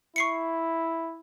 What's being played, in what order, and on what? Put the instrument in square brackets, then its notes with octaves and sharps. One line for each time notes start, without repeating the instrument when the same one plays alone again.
[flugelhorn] E4 [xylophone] C#6 C7 C#7